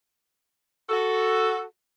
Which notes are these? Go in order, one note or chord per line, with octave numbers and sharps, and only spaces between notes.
F#4 A4